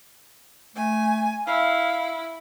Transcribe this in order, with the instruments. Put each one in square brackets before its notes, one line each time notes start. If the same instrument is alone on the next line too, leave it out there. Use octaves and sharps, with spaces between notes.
[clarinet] A3 [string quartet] G#5
[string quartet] E4 [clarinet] F5